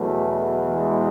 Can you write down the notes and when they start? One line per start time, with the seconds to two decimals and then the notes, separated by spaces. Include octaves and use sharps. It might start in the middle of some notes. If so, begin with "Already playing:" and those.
Already playing: E2 B2 F#3 A3
0.68 E3 G#3